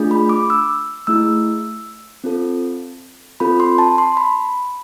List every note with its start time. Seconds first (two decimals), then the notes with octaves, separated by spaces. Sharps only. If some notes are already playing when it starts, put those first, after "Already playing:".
Already playing: A3 D4 F4 G#4
0.11 B5
0.29 D6
0.50 E6
1.07 A3 E4 G#4 E6
2.24 C4 F4 A4
3.40 C4 F4 A4 B5
3.60 C6
3.78 A5
3.98 C6
4.17 B5